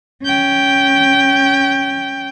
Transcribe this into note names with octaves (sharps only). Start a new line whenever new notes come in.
C#4 G5